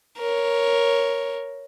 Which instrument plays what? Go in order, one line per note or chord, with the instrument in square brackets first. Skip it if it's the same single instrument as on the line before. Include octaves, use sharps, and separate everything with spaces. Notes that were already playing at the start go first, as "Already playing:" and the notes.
[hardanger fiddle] A#4 C#5